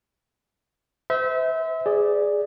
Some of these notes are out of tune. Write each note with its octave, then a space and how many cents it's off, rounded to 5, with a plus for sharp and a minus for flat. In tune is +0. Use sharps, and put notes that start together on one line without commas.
C5 -35 E5 -30
G#4 +0 D5 +0